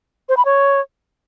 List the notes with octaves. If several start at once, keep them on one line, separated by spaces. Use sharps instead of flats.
C5
B5
C#5